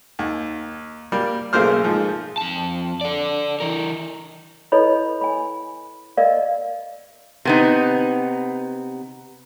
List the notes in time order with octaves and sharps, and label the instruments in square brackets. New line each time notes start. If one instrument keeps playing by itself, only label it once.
[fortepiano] D#2
G3 A#3
B1 C#3 A3 A#3 C5 F6
G#2 F3
[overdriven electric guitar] F2 A5
A4 D5
E3 A#4
[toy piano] E4 A4 B4 C#5 D#5 B5
G#5 B5
A#4 D5 D#5 F5
[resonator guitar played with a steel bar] C3 B3 D#4